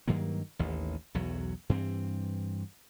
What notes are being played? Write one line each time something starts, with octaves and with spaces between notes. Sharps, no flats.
G2 D#3 F#3 A#3
A1 D#2
B1 E2 F#3
G2 E3 C4